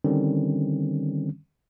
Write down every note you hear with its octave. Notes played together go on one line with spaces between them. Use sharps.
D3 D#3 G3 C4 C#4